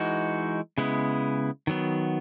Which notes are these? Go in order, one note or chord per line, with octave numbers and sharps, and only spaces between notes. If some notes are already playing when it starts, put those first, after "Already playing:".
Already playing: E3 G#3 D#4 F#4
C#3 G#3 B3 E4
D#3 F#3 B3